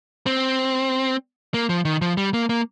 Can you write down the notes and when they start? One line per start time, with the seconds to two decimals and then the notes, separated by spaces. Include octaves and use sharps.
0.26 C4
1.54 A#3
1.69 F3
1.85 D#3
2.01 F3
2.17 G3
2.34 A#3
2.49 A#3